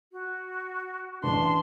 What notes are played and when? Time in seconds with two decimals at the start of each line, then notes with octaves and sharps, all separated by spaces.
0.12 F#4
1.24 A1 E3 D4 C6